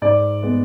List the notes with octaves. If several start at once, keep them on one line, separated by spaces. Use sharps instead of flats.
G#2 D5
G#3 B3